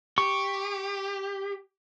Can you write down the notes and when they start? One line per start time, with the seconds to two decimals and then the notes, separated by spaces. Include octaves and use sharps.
0.18 G4 C#6